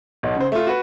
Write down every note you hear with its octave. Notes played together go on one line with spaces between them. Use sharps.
B1 B2
C#3 C5
A3 F4
F#4 B4